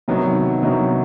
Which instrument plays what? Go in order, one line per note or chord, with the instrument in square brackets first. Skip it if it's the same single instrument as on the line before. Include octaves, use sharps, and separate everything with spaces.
[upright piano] C3 D#3 F#3 B3 D#4
C3 D#3 F#3 B3 D#4